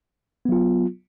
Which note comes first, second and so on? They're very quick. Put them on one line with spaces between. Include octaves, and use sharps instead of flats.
B3 F#3 F4